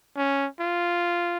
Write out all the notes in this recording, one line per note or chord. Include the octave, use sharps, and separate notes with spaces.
C#4
F4